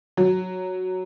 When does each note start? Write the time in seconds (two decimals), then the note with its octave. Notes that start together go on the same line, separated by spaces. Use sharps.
0.17 F#3